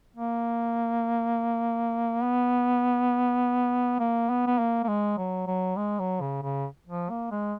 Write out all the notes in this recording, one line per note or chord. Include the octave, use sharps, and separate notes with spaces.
A#3
B3
A#3
B3
B3
A#3
A#3
G#3
F#3
F#3
G#3
F#3
C#3
C#3
F3
A#3
G#3